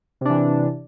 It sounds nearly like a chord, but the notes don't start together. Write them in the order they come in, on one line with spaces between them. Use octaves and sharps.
C3 D4 E3